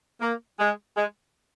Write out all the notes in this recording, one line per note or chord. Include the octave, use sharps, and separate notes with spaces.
A#3
G#3
G#3